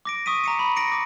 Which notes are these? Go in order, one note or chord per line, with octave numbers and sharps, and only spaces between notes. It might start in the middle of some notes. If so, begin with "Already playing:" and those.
D6 A#6 D7
C#6 D#6 B6 D#7
A#5 C#7 D#7
B5
A#6 C#7 D7
D6